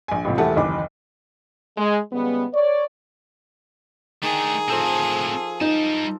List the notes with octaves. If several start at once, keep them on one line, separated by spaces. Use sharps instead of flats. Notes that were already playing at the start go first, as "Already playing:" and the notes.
A#1 G#5
A1 A2 C3 F3
E1 A3 E4 G4 F#5 A5
F#1 D#2 E3 D6
G#3
C#3 G3 G#3 B3
C#5 D5
D#3 A3 D4 G#4
A2 F3 C4 A4
G3 D#4 A5